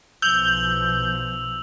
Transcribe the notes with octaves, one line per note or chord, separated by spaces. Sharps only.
B1 B2 F3 E6 G6 F7 F#7